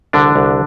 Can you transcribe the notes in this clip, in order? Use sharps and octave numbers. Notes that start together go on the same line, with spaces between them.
C2 D3 D4
C2